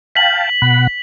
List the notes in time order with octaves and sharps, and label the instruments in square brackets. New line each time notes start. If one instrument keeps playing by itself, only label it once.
[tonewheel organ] F5 G5 A5 [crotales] B6 F#7
[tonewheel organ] B2 F#5 B5